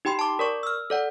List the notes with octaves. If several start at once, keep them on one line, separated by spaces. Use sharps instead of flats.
D#4 G4 G5 B5 C6
A5 D6
A#4 D5 C#6
E6 F6
A4 D5 F#5